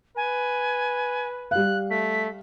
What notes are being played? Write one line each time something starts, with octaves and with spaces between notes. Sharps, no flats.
B4 G#5
G3 F5 F#6
A3 B6